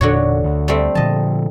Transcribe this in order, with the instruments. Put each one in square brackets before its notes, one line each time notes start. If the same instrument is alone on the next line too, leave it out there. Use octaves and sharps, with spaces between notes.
[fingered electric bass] E1 E2 A#2 [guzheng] D3 F#4 C#5
[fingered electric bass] D2
[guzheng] G3 A3 C4
[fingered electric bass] A#2 D3 F3 [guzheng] D#5 A5